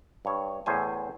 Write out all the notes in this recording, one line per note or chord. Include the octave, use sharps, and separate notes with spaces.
G2 C#5
E2 A2 C5 G#5